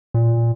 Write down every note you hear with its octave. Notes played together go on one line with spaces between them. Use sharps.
A#2